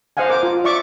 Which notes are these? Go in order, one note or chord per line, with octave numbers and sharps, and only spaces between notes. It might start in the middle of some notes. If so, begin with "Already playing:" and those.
C5 D#5 F5 F#5 G#5
A#4 D6
F4
D5 E5 C#6 D6